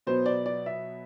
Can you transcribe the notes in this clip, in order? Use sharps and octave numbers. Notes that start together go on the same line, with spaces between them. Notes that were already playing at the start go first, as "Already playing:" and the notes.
B2 F#3 B3 C5
D5
D5
E5